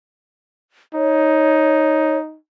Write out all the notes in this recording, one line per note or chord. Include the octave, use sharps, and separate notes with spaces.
D#4 C#5